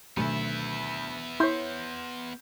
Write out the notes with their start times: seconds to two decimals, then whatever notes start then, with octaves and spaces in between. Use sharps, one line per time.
0.17 D2 B2 D#3 F#3 B3 E5
1.40 E4 C#5 C6 G6